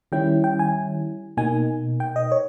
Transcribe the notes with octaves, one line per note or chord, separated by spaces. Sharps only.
D#3 G3 C#4 E4 G5
G5
G#5
B2 A#3 D#4 G#5
G5
D#5
C#5